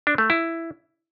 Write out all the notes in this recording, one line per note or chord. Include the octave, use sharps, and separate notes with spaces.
D4
A3
E4